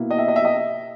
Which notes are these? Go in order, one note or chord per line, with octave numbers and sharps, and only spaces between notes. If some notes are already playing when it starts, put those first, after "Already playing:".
Already playing: B2 A#3 E4
D#5
E5
D#5
E5
D#5